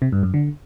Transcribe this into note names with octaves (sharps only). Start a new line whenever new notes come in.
C3
G2
F#2
D3